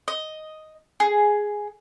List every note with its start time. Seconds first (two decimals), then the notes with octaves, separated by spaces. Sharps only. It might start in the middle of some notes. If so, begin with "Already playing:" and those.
0.08 D#5
1.00 G#4